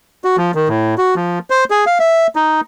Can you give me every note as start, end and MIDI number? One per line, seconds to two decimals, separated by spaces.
0.24 0.36 66
0.37 0.52 53
0.55 0.68 51
0.69 0.95 45
0.98 1.15 66
1.16 1.39 53
1.50 1.64 72
1.70 1.85 68
1.86 1.98 77
2.00 2.27 76
2.36 2.61 63